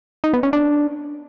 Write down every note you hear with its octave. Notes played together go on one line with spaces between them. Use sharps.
D#4
B3
C#4
D4